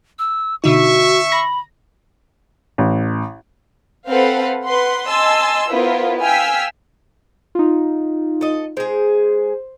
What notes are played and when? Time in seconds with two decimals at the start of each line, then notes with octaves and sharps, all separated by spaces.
0.19 E6
0.64 B2 D3 D#4 F#4 E5 C#6
1.32 B5 A#6
2.78 A1
4.08 C4 A4 B4 C5 F5 F#5
4.65 B4 F#5 C6
5.08 D#5 G#5 A5 C6 E6
5.70 B3 E4 F4 A#4 C5
6.22 F5 G5 G#5 E6 F6 B6
7.55 D#4 F4
8.41 A4 D#5
8.77 G#3 G#4 C5